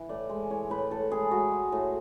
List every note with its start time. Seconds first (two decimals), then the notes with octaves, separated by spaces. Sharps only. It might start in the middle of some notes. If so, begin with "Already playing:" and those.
Already playing: E3
0.09 A2 D5
0.29 G#3
0.50 E3 C#5
0.70 A2 B4
0.91 A2 A4
1.11 G#3 G#4
1.31 G#3 F#4
1.52 G#3
1.72 A2